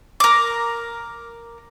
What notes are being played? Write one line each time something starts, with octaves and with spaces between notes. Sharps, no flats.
A#4 D6